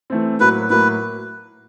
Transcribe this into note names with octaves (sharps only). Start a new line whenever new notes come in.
E3 A3 C4
A2 F#3 A#3 B4
A2 F#3 A#3 B4